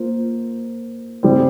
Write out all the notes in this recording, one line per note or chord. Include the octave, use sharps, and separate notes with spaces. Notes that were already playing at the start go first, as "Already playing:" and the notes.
Already playing: A#3 F4 C5
C#3 G3 C4